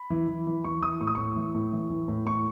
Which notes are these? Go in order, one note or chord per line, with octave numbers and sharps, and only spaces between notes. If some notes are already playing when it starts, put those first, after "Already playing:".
Already playing: B5
E3
E3
E3
E3 C#6
E3 D#6
A2 C#6
D#6
A2 C#6
E3
A2
E3
E3
A2
A2 C#6